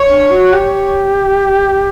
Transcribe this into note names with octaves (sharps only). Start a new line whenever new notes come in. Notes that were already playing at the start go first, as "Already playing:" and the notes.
Already playing: C#5
D4
F#4
G4